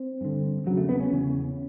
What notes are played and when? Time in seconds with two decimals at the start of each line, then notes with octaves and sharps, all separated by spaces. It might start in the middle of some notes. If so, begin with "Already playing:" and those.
Already playing: C4
0.21 G2 D3
0.66 E2 C#3 F#3
0.77 A3
0.89 B3
1.00 C#4
1.12 E2 C#3